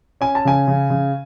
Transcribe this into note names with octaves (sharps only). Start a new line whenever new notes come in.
C#4 G#5
A5
C#3 G#5
C#3
C#3